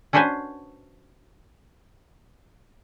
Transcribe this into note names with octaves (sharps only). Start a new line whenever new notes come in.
C#4 D4 F#4 B4 C5 G#5